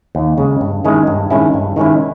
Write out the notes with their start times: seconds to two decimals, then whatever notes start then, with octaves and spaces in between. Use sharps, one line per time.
0.15 D#2
0.38 C#3 G#3
0.61 G2
0.84 D#3 G#3 C#4 E4
1.07 G2
1.30 D#3 G#3 C#4 E4
1.54 G2
1.76 D#3 G#3 C#4 E4